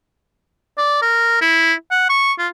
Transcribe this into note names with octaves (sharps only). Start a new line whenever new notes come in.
D5
A#4
E4
F#5
C#6
F4